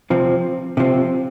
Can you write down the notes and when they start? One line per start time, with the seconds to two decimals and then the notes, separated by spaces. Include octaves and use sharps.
0.10 C3 F3 C4
0.77 C3 F3 C4